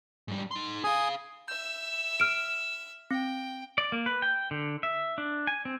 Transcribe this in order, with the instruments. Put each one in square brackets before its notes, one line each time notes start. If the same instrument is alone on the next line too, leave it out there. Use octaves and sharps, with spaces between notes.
[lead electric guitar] G#2 G3
D#4 C6
[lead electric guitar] G#4 F5 [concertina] G#5 D#6
[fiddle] E5 E6 [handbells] G6
[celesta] F6 D7
[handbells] C4 [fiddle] G5
[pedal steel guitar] D5
A#3
B4
G5
D3
E5
D4
G#5
C4